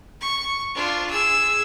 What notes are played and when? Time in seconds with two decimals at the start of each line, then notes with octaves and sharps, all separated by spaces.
0.21 C#6
0.75 D4 F4
1.09 G#4 E6